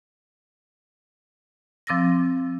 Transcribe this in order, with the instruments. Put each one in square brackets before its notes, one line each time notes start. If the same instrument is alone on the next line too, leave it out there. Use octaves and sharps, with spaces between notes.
[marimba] F3 C4 D6 E6 A6 A#6